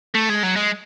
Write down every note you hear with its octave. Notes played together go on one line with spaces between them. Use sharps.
A3
G#3
F#3
G#3